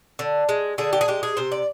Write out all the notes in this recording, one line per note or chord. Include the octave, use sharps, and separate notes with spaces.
D3
G#3
D3 G#4
G4
G#4
G#3 G4
G#4
C3 C5
D5